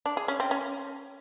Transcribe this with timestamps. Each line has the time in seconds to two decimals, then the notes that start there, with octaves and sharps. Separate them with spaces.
0.06 D4
0.17 G#4
0.28 C#4
0.40 C4
0.51 C#4